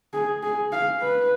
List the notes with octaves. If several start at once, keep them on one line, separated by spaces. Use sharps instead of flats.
G#4
G#4
F5
B4